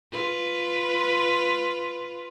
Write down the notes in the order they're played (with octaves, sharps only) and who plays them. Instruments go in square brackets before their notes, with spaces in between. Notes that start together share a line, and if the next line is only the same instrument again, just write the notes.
[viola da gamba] F4 B4